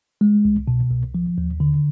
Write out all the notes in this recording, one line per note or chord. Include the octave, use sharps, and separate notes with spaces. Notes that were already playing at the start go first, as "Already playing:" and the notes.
G#3
C2
B2
C2
F3
D#2
D3